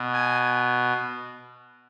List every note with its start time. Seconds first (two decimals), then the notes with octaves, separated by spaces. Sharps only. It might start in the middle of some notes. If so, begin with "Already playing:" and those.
Already playing: B2
0.13 G#5